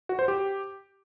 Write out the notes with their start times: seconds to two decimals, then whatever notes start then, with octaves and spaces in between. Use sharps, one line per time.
0.09 F#4
0.19 C5
0.28 G4